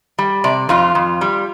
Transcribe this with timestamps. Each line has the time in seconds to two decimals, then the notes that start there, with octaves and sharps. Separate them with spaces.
0.19 G3
0.44 C3 D5
0.69 F2 F4
0.95 F2
1.21 G3